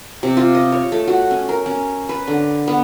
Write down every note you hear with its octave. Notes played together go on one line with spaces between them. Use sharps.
C3
F4
D#5
C#5
A3
F#4
C#4
A#4
C#4
B4
D3
B3